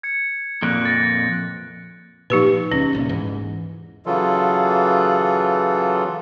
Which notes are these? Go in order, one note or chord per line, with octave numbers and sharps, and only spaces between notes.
G#6 C#7
F2 A#2 F#6 D7
A6 A#6
A#2 F3 D#4 G4 B4
C#2 C#4
D#1 C2 A#2
E1 G#2 E3
C#3 E3 F#3 F4 A4